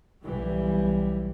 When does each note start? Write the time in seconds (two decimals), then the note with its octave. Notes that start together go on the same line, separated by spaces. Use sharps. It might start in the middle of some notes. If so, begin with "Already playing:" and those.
0.23 B1 E3 G3